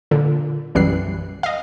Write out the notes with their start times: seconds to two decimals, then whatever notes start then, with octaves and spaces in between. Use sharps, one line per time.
0.11 A#2 D3
0.75 B1 F#2 E3 G3 F#6 C7
1.43 D#5 F5